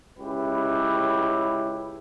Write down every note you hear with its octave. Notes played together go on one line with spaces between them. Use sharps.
C#2 C#4 E4 G4 B4